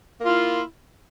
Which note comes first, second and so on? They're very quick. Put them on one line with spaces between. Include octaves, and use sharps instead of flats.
A#3 F4 E4